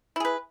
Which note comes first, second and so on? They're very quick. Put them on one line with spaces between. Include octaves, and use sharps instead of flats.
E4 G#4 B4